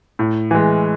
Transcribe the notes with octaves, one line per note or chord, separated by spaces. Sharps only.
A2
E3 G#3